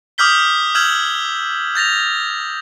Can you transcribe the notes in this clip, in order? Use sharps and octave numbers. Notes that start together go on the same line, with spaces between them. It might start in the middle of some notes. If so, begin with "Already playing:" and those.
D6 D#6 F6 G6 B6 G7
E6 F6 G6 G#6 E7 F#7
G6 A6 A#6 F7